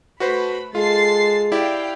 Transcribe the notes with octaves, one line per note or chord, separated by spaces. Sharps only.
A3 F#4 B4 C5 B5
G#3 F4 A4 A6 C7
E4 G4 D5 F5 G5